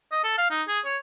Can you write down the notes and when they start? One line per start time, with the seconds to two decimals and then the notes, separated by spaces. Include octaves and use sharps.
0.12 D#5
0.24 A4
0.38 F5
0.50 D#4
0.68 G#4
0.85 C#5